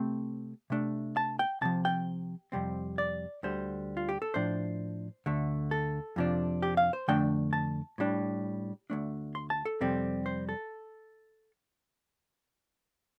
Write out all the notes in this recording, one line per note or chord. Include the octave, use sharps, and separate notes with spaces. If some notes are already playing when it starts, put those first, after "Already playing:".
Already playing: C3 A3 C4
C3 A3 D4
A5
G5
C2 C3 F3 A5
G5
F2 C3 G3 C4
D5
D2 D3 G3 C5
F4
G4
A4
A2 F3 D4 C5
D2 D3 A3
A4
F2 C3 F3 D4
G4
F5
C5
F2 D3 A3 D4 G5
A5
A2 G3 D4
D2 D3 A3 D4
C6
A5
A4
F2 C3 G3 C4
C5
A4